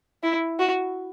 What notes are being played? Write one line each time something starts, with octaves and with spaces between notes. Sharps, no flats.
E4
F#4